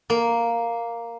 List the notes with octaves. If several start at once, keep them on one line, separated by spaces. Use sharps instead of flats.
A#3